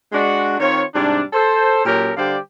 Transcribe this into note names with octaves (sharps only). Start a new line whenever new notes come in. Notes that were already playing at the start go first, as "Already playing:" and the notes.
G#3 D4 F#4
D#3 C4 F4 C#5
G#2 C3 G3 D4
A4 C5
A#2 F#3 C#4 G4 A4 A#4
D3 G3 G4 C5 D5 F5